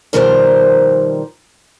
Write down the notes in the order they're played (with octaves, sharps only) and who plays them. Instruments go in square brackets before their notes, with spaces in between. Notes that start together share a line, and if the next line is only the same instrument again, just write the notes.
[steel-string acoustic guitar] B2 D#3 F3 G3 A#4 C5